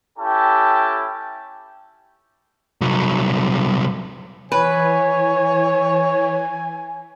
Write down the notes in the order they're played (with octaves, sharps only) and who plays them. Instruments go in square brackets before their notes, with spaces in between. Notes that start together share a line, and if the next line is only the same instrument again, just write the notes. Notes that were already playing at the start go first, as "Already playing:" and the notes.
[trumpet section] C#4 E4 G4 A4 G5 A5
[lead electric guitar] C2 F#3
[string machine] E3 [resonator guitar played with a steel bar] B4 [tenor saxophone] C#5 [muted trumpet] G#5